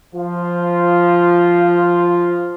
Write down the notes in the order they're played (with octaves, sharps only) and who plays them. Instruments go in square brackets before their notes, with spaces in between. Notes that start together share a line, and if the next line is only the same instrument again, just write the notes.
[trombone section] F3 F4